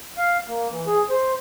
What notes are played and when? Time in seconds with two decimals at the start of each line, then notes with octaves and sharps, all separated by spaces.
0.17 F5
0.48 A#3
0.71 E3
0.87 G#4
1.10 C5